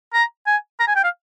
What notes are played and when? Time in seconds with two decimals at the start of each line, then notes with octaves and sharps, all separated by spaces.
0.14 A#5
0.47 G#5
0.80 A#5
0.88 G#5
0.96 G5
1.04 F5